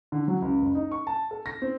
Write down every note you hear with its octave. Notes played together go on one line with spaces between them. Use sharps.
D3
F#3
C#2
F#1
D#4
C#6
A5
A4
A#6
C4